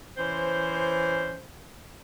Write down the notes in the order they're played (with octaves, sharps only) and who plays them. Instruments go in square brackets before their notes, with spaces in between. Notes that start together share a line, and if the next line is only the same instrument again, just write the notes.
[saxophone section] E3 C#4 C5